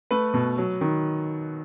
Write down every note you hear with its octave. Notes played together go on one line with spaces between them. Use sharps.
A3 B4
B2
F#3
D#3